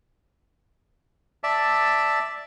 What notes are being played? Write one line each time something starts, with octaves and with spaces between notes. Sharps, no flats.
D5 E5 A5